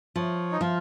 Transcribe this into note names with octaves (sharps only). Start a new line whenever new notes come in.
F3 C#5
D#4
F3 F4